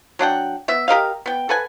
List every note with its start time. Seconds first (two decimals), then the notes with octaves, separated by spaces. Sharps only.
0.19 F#3 D4 F#5 G5
0.68 B3 E5
0.88 G4 A#4 D#5 F5
1.26 B3 G5
1.49 A4 B4 F#5 G#5